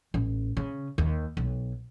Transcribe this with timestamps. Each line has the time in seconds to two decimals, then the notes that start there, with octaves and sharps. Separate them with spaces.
0.14 A1
0.57 C#3
0.98 D#2
1.37 B1